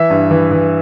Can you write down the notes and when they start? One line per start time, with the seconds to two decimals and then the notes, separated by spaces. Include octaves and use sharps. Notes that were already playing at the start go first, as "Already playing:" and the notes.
Already playing: E3 E5
0.10 G2
0.31 E3
0.51 E3